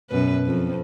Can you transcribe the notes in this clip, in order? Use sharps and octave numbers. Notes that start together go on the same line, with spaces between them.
F#2 B2 B4
F2